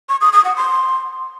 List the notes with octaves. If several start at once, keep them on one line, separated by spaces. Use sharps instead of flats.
C#6
D#6
D#6
F#5
C6